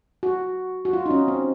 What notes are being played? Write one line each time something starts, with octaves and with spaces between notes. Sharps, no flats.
F#4
F#4
F4
D#4
C#4
C4